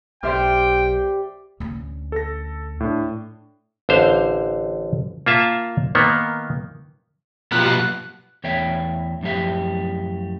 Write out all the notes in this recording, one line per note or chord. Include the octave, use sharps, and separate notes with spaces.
B1 G4 C5 D5 E5 G5 C6 F6
D2 C#4
A4 A#6
A2 D4
A1 D3 C5 F5
A#3 F4 E5 A5
D#3 A#3 B3
B1 F3 A#3 B3 F4 G4 F#6
E2 A2 C#5 E5 G5
F#2 A2 F3 G4 E5